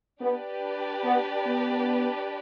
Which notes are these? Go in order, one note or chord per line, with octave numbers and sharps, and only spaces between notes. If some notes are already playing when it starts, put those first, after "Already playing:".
B3 D4 G4 B4 D5
B3
B3